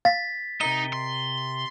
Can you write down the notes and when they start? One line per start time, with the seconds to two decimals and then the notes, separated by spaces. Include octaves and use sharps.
0.05 F5 A6 B6
0.61 C3 D#4 A#4 D#5 G7
0.93 C6